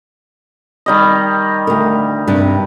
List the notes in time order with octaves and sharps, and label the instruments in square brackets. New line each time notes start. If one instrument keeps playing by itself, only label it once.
[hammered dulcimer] D#3 G3 D#5
[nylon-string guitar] D2 A#4
G2 C3 D4